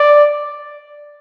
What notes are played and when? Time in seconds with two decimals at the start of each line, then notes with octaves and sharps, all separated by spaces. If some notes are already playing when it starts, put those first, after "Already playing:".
Already playing: D5